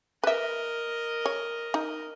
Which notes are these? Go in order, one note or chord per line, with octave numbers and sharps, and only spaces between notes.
A#4 B4 D#5 E5
C#5
D#4